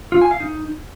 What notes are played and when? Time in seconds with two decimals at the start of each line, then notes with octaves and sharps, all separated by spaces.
0.12 F4
0.22 G#5
0.31 F5
0.40 D#4